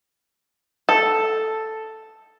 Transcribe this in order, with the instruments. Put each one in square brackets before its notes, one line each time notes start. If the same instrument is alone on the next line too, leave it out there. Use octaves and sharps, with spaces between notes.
[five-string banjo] A4